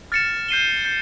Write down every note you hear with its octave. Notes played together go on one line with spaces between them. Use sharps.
F6 A6 C#7 E7
G6 C7 D#7 G7
G6 C7